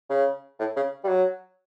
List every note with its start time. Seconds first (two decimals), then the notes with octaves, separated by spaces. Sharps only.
0.10 C#3
0.59 A2
0.76 C#3
1.04 G3
1.09 F#3